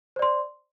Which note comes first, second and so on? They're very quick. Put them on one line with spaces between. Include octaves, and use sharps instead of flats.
C5 D5 C6